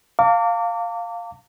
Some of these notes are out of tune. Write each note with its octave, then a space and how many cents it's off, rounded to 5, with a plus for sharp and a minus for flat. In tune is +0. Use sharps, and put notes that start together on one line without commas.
F5 +5 A#5 -45 D6 -30